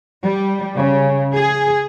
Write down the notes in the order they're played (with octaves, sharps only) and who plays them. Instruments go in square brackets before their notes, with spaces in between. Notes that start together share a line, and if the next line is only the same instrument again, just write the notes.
[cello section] G3
C#3
G#4